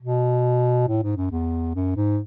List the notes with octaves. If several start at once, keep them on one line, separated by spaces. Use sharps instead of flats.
B2
A2
G#2
F#2
E2
F#2
G#2